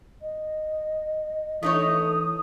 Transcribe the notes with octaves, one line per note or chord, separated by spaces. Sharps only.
D#5
E3 A3 D#4 C#5 D#6